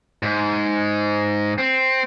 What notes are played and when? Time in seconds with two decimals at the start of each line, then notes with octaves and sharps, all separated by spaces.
0.23 G#2
1.58 C4